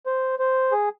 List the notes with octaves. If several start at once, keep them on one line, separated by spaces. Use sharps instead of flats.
C5
C5
G#4